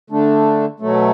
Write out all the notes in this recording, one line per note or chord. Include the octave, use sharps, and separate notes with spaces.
D3 A3 D4
B2 F#3 A3